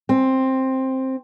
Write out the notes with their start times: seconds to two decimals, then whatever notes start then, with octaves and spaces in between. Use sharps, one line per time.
0.09 C4